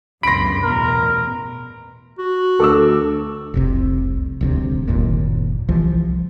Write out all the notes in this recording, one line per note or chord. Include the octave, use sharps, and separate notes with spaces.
G1 C#2 F#2 B5 C6 A#6 D7
A1 E2 B2 A#4
F#4
D2 A4 D6 E6
F1 C2 C3
D#1 D2 C3
F#1 D#2 A#2
C2 E3 F3